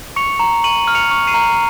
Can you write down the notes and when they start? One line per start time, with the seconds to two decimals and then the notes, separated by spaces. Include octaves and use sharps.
0.16 C#6 C#7 F7
0.40 A#5
0.64 C#6 D#7 F#7
0.88 F6
0.95 C#7 F7
1.11 C#6
1.27 C7 D#7
1.34 A#5